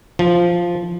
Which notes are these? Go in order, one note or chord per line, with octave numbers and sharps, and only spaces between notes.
F3